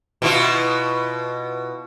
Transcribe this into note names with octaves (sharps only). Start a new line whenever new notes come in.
B2 E4 F4